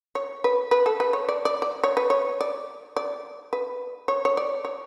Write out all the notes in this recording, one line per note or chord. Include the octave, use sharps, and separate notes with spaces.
C#5
B4
B4
A4
B4
C#5
D5
D5
D5
C#5
B4
C#5
D5
D5
B4
C#5
C#5
D5
C#5